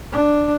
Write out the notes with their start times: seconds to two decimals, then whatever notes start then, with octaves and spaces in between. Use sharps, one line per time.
0.12 D4